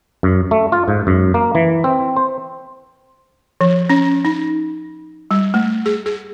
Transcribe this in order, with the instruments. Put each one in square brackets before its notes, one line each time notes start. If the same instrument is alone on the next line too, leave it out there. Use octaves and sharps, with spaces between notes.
[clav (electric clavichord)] F#2
A3
F4
G#2
F#2
A#3
E3
C4
C5
[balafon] F3
C#4
D#4
G3
A3
G#4
G#4